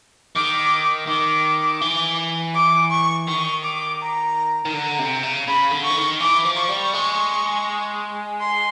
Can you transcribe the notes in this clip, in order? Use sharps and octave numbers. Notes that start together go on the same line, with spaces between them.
D#3 D6
D#3 D6
E3
D6
C#6
D#3 C#6
D6
A#5
D#3
D3 A#5
C3
C#3
C#3 B5
D3
C#6
E3
D#3
E3 D6
F3
C#6
G3
G#3
C6